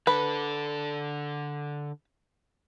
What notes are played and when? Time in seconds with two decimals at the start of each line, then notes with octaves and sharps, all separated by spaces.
0.07 D3 A4 B4